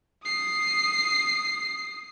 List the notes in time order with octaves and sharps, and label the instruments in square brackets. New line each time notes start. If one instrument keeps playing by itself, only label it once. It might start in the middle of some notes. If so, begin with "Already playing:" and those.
[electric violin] D#6 C7